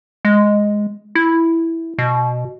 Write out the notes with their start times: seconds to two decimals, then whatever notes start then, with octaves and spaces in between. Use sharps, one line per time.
0.25 G#3
1.15 E4
1.98 B2